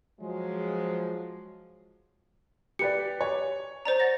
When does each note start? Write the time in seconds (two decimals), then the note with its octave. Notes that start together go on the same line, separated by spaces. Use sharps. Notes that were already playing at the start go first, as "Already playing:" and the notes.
0.20 F3 F#3 G#3
2.79 G4 B4 D5 C#7
3.21 C#5
3.85 C5 D5 A#5
4.00 F#5 A6 A#6